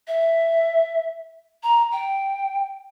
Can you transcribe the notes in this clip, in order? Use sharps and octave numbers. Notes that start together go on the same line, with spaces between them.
E5
A#5
G5